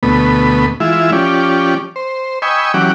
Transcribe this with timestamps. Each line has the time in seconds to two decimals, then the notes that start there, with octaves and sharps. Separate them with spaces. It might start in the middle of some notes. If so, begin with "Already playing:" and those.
0.03 D2 B2 A3 B3 B5
0.80 E3 G#3 E4 F4 E5
1.12 F3 C#4 G4 D5
1.96 C5
2.42 D#5 G5 G#5 B5 C#6 E6
2.74 E3 F#3 C#4 G4 F#5 D6